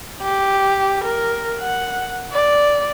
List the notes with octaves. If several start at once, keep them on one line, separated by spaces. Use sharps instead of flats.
G4
A#4
F#5
D5